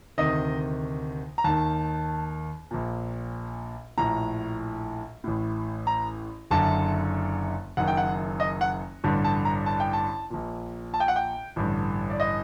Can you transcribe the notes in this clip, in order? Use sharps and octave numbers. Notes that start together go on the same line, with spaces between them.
D2 C3 D#3 D#5
A#5
D#2 D#3 A5
A#1 A#2
A#1 A2 A#5
A1 A2
A#5
F#1 F#2 D3 A5
F#1 F#2 D#3 F#5
G5
F#5
D#5
F#5
A1 G2 D3
A5
A#5
A5
G5
A5
A#1 A#2
A5
G5
F#5
G5
A1 G2 D3
D5
D#5